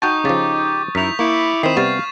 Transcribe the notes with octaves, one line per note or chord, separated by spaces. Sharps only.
D#4 F#4 G5 A5 C#6 D#6 G6
C#3 F3 G4 A6
F#2 D#4 E4 B6 F7
A#3 E4 B5 C#6 D6
D#3 C4 B5 D#6 C7 E7
C3 G3 B3 F5 C#6 A6 C7